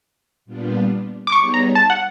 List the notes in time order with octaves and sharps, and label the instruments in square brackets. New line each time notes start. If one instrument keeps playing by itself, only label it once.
[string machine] A#2 G3 B3 D4 F4
[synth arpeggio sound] D6
[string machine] G3 B3 D#4 G#4 C#5 [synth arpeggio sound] C#6
[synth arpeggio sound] A#5
A5
F#5